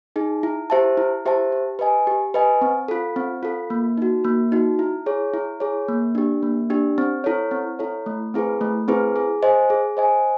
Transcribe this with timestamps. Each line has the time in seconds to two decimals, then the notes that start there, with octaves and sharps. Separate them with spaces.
0.16 D#4 G#4
0.43 E4
0.70 G4 C5 E5 A5
0.97 E4
1.26 G4 C5 E5 A5
1.52 G4
1.79 B4 D#5 G#5
2.07 G4
2.34 B4 D#5 G#5
2.61 C4
2.88 F4 A4
3.16 C4
3.43 F4 A4
3.70 A#3
3.98 D#4 F#4
4.24 A#3
4.52 D#4 F#4
4.79 E4
5.06 G#4 C#5
5.34 E4
5.60 G#4 C#5
5.88 A#3
6.15 D4 G4
6.43 A#3
6.70 D4 G4
6.98 C4
7.24 E4 A4 C#5
7.51 C4
7.79 E4 A4 C#5
8.06 A3
8.34 C4 E4 G#4 B4
8.61 A3
8.88 C4 E4 G#4 B4
9.16 G#4
9.43 C5 D#5 G#5
9.70 G#4
9.97 C5 D#5 G#5